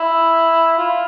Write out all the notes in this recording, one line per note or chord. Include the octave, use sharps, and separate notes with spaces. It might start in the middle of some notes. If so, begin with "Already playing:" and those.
Already playing: E4
F4